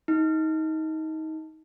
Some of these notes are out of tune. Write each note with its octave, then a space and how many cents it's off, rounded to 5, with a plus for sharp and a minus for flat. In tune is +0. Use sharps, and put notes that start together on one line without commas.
D#4 +25